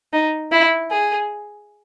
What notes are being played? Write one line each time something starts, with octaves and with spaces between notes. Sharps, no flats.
D#4
E4
G#4